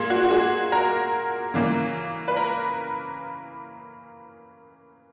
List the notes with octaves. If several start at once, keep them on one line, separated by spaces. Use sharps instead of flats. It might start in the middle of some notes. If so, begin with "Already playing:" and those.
Already playing: A#2 A#3 G#4
F#4
F#4
G#4
A#4
C#3 E3 A#3
B4
A#4